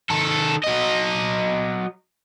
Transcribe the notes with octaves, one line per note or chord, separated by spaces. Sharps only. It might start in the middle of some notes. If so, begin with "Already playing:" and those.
D#3 A4
F#3 D#5